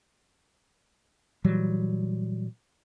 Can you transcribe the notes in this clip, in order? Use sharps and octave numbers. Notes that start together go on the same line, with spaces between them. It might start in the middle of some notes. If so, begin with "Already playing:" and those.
A#2 E3 F#3 G3